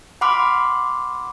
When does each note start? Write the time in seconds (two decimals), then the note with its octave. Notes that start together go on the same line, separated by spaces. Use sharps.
0.21 F#5 B5 C6 D6 F6